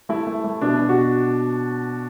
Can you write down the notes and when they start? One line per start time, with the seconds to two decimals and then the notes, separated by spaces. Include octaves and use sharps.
0.09 A3 E4
0.27 A3
0.44 A3
0.61 B2 D4
0.79 B2
0.89 F#4